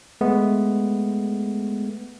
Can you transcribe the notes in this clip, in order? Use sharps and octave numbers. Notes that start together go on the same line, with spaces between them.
G#3 A3 B3